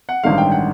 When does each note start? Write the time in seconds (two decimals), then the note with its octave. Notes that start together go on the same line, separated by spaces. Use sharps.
0.09 F#5
0.24 A1 G2 D#3 G#3 F5
0.38 G5
0.52 F#5